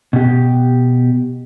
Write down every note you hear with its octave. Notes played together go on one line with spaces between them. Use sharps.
B2 G4